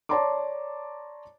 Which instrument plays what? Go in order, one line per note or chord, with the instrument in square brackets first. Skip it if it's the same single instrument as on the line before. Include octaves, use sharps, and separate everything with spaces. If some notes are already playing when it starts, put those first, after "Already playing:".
[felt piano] C#5 D5 A5 A#5 C6 D6